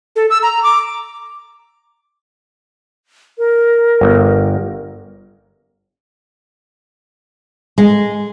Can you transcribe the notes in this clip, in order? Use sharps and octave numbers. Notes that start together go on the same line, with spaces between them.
A4
E6
A#5
D6
A#4
G1
G#3